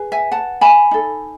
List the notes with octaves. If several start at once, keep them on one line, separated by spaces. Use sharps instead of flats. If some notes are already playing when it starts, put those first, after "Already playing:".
Already playing: G#4 B4
E5 G#5
F#5 A5
G#5 B5
D#4 A4